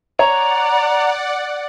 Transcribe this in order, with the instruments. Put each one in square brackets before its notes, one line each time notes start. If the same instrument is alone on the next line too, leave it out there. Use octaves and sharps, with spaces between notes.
[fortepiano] C#5 [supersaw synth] D5 F#5 [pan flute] A#5